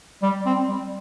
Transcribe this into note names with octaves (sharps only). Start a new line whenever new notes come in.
G3
C4
G3